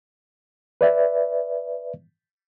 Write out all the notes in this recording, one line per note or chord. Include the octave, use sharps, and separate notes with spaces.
B4 D5 E5